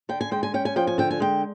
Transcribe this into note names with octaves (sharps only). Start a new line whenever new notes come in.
D3 G5
G#5
G#3 G5
G#5
C#4 G5
G#5
F3 G5
G#5
D3 G5
G#5
G#3 G5